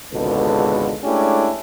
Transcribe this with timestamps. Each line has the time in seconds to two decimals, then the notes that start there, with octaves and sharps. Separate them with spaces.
0.13 G#1 C#2 B2 D3 A4 B4
1.04 G#3 A3 C#4 D4 E4 G4